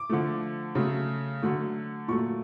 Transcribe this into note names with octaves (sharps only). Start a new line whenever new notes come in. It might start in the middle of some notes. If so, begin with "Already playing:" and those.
Already playing: D6
D3 F3 A3
C#3 F#3 A3
D3 F#3 A3
A#2 F#3 A3 C#6